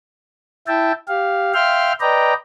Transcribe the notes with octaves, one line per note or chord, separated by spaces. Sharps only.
E4 E5 G5 A5
G4 F5
E5 F5 G5 C6 F6
B4 D5 D#5 G5 A#5